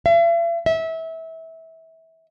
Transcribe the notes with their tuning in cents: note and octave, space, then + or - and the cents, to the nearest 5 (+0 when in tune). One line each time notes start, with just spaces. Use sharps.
E5 +45
E5 -25